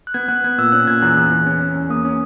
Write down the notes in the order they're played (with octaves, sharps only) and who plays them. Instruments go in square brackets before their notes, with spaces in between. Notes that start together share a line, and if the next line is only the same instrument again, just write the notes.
[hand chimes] F#6
[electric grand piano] B3 [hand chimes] G#6
[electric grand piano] B3 [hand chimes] F#6
[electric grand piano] B3 [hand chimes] G#6
[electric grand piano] A#2 [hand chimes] E6
[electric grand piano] C#4 [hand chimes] F#6
[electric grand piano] A#2 [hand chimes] G#6
[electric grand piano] E2 [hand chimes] F#6
[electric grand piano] E2
E2
C#4
C#4
E2
[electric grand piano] A#3 [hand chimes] D#6
[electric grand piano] C#4